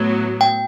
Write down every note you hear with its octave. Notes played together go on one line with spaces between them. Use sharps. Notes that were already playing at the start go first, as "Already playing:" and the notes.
Already playing: A2 F#3 B3
G5